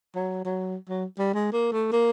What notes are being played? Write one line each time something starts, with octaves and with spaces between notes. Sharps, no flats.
F#3
F#3
F#3
G3
G#3
A#3
A3
A#3